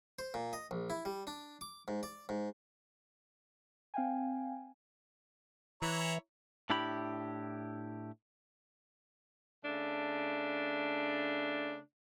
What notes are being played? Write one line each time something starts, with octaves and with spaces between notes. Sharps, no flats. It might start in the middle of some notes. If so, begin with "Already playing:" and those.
C5
A#2
D#5
A#1
E4
G3
D4
D6
G#2
D5
G#2
C4 F5 G5 G#5
E3 E4 C#5 A#5
A2 D4 E4 G4 B5
C#3 A3 D4